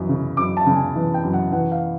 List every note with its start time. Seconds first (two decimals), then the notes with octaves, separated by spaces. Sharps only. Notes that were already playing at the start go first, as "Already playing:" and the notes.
Already playing: F#2 E3
0.09 C#3
0.37 F#2 D6
0.57 A5
0.66 C#3
0.76 G#5
0.96 E3
1.14 G5
1.23 F#2
1.33 F#5
1.52 E3 F#5
1.72 F5